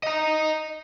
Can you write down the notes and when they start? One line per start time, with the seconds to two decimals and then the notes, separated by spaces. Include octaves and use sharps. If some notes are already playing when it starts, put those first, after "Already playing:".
0.03 D#5 A#5